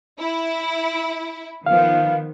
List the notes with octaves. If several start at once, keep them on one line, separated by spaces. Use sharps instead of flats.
E4
D#3 F3 B3 F5